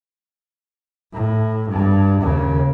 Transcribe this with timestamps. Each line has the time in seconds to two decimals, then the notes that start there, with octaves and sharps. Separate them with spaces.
1.13 A2
1.70 G2
2.22 D#2 C#3